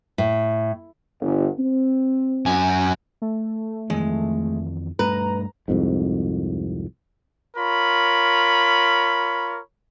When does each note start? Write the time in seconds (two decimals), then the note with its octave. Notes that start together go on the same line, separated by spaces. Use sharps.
0.18 A2
1.21 G1
1.59 C4
2.46 F#2 G#5
3.22 A3
3.90 F2 D#3 E3 G#3
4.99 G2 A3 B4 A#5
5.68 C2 F2 G#2
7.57 F4 A#4 C#5 B5